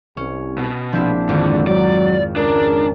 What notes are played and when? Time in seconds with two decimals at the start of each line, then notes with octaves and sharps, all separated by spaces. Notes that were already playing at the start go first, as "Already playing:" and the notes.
0.17 C2 C#4
0.58 B2
0.92 A#1 F3 C4 D4 E4
1.29 G#1 F2 D3
1.67 F#3 D5
2.36 C#2 C#4 D4 G#4 A#4